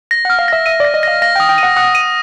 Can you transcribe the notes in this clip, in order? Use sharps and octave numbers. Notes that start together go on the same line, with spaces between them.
A#6
F#5
F6
F5
E5 A#6
E5 D#7
D5
A#6
D#5
F5 A#6
F5 A#6
G5
D#6
G5
D#7
F#5
F#5 D#6
D#7